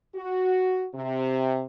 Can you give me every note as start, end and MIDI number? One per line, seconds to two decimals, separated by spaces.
0.15 0.86 66
0.94 1.64 48